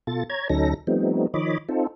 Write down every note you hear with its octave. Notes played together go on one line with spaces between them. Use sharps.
B2 F4 A4 A6
C#5 A#5 G#6
D2 F#3 C#4 D#4 A4 A#6
F3 G3 A3 B3 C4 D#4
D#3 F3 C#5 D#5 B5 D6
C4 D#4 F4 A4